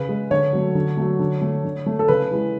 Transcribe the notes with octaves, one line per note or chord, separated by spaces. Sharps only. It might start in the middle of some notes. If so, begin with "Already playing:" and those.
Already playing: C#3 B4
G#3
D3 C#5
F#3 A3
D3
F#3 A3
D3
A3
D3
A3
A4
C#3 B4
E3 G#3